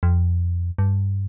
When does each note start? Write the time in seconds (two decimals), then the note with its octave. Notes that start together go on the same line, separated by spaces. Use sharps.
0.03 F2
0.78 G2